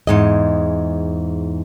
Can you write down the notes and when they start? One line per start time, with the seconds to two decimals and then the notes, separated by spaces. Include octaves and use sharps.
0.07 E2 G#2 D#5